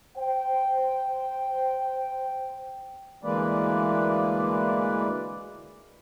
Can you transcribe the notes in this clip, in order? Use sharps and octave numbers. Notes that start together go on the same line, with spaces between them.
C5 G5
D2 E3 G#3 A#3 B4 D5